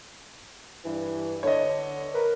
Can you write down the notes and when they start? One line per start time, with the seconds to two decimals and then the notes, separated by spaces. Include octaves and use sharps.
0.85 G2 E3
1.43 D3 C#5 D#5
2.14 A#4 B4